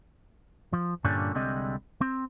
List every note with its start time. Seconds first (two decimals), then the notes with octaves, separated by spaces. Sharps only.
0.73 F3
1.04 G2 A#2 D3 G3 C#4 D4
1.34 C2 D3 G3 G#3 C4 D#5
2.01 C4